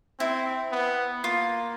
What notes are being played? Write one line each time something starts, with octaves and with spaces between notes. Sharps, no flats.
C4 E4
B3
A#3 F4